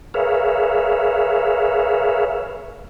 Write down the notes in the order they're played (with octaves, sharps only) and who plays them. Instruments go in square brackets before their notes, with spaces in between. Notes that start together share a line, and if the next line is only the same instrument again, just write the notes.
[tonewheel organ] G#4 A#4 B4 C#5 E5 F5